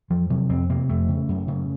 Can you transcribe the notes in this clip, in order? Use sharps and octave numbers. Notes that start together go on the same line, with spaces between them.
F2 F3
C3 F#3
F2 C4
C3 A#3
F2 A3
C#3
F#2
C#3